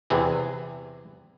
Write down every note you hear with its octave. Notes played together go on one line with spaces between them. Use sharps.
E2 C3 E3 G#4